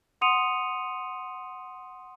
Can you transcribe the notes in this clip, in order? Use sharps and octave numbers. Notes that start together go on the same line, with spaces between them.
F#5 C6 D#6 C#7 D#7 F7